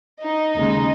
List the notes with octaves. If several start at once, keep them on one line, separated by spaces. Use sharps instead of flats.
D#4 D#5
D#2 C#3 G#3 D#4